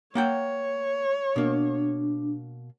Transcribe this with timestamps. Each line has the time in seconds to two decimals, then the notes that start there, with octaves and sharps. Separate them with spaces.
0.15 A#3 C#5 F#5 G5
1.36 B2 A#3 D4